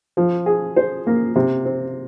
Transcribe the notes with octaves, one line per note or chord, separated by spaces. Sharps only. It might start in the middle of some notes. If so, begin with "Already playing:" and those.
F3
G#4
C5
A#3
C3
C4